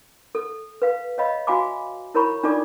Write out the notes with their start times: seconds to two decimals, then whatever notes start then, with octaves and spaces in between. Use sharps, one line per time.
0.35 A4
0.82 B4 F5
1.18 C#5 D#5 F5 B5
1.47 F#4 E5 F5 G#5 B5 D6
2.14 E4 A#4 C#5 A#5 B5 C#6
2.43 D4 D#4 F4 A4 D5 D6